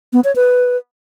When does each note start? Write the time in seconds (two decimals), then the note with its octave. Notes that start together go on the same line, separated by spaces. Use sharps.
0.13 B3
0.24 C#5
0.36 B4